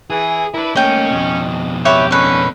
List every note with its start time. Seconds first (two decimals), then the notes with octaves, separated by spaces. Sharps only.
0.10 E3 G#4
0.54 D4 E4 A#4 B4
0.76 A3 A#3 C#4 D#5 G5
1.10 F2 B2
1.85 G4 B4 C#5 E5
2.11 D3 D#3 C#4 B4 C#6